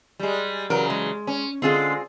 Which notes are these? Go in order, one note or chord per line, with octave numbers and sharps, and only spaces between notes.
G3 G#3
C#3 E3 F#3 A#4
G#3
C#4
D3 G#3 C4 F4 G#4